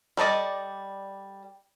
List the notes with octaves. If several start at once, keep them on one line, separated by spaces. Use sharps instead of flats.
G3 A4 D5 D#5